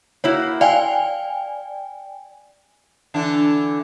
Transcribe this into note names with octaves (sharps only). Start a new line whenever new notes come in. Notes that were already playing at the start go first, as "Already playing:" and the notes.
A#3 E4 F#4 C#5
D5 F5 G5 G#5
D3 E3 D4